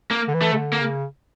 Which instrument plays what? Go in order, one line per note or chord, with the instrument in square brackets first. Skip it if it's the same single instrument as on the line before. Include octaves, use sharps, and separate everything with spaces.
[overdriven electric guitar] A#3
[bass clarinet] D3
E3
[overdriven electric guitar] A3
[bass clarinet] C#3
D3
[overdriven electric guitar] A#3
[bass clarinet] C#3